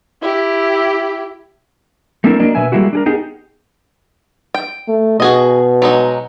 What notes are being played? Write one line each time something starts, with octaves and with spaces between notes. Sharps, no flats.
E4 G4
A3 A#3 C4 D4 E4 A#4
F#3 A#3 D4 A#4 D5 D#5
B2 B4 E5 G#5
G3 G#3 A#3 E4 F#4
D4 G#4 A#4
B3 D#4 G4 G#4
G5
A3
B2 F#4 G#4 D#5
F#3 G#3 D#4